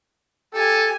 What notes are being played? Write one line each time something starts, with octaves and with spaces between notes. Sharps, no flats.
G4 A4 G#5